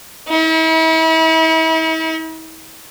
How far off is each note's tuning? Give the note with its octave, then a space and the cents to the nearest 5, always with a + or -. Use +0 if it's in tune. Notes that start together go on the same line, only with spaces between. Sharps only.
E4 -40